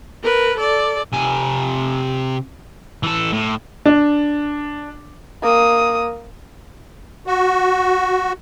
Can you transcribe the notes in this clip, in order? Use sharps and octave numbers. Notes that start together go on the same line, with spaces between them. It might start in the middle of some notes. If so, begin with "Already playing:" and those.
A#4 B4
A4 D5
C3 G#5
E3 A4
A2
D4
A#3 D#6
F#4